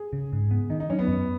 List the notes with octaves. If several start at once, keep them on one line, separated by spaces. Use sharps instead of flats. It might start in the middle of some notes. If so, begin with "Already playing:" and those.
Already playing: G#4
C#3
G#2
B3
D#3 D#4
D#4
F#3 C#4
B3
F#2